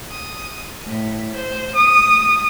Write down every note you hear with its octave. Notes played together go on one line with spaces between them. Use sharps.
D#6
A2
C5
D#6